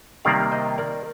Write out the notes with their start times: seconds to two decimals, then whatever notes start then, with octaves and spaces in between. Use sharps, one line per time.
0.25 C3 D#3 G3 A#3 D5 F5
0.52 C5 D#5
0.78 A#4 D5